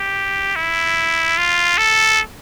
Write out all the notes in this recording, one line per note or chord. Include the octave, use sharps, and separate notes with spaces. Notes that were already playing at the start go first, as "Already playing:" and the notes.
Already playing: G4
E4
F4
A4